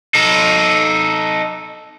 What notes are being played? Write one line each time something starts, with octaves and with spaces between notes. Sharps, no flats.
D#4 A4